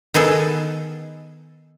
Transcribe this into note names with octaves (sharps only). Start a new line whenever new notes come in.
D#3 B3 G#4 A4